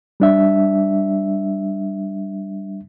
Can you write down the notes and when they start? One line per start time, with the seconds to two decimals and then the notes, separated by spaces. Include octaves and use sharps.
0.20 G3 D4 E5